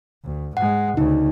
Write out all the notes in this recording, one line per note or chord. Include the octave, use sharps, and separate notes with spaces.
D2
G#2 G#3 F#5
D2 C#3 D#4